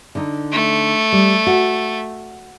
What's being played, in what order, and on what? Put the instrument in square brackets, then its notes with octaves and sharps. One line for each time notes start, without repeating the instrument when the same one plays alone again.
[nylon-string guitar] D3 D#4
[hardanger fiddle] A3
[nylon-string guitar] G3
F#4